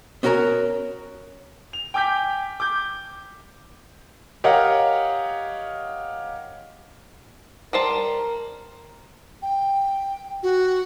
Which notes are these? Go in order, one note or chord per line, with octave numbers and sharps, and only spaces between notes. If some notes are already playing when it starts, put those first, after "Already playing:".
B3 C#4 F#4 A#4 C#5 G#5
F7
G5 G#5 D6 G6 B6
D6 G6
G4 A#4 C#5 D#5 F5 F#5
G3 A#4 C5 A5
G5
F#4